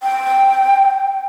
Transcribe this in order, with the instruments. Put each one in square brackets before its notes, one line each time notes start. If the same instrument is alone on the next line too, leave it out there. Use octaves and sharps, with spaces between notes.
[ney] G5